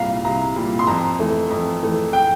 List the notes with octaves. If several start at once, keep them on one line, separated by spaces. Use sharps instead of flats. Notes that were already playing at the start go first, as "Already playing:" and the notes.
Already playing: C2 A#2 G3 F5 A#5
C2 A#5
A#2 G3
C6
F2 A#5
E3 A3
F2
E3 A3
G5